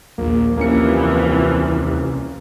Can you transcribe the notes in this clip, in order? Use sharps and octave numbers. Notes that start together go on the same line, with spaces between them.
A#1 D#2 A#3
C2 E3 F3 G3 A#3 C#4 C#7